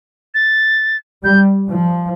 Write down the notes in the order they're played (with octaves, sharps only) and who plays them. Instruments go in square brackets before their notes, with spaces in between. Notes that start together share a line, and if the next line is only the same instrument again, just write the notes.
[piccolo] A6
[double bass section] G3 [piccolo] G6
[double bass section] F3